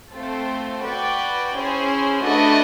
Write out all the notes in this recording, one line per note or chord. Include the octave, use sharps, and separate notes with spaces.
A3 C4 F4 A4 C5
F#4 B4 D5 G5
C#4 E4 G#4 C5
A3 D4 F#4 B4 D#5